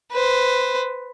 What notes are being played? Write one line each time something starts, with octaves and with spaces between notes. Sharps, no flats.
B4 C5